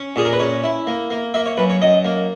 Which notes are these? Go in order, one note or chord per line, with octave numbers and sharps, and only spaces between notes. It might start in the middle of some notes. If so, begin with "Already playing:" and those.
Already playing: C#4
A#2 G#4
A#4
B4
C#4 C#5
E4
A#3
A#3
A#3 E5
C#5
F#2 B4
C#5
F#2 D#5
A#3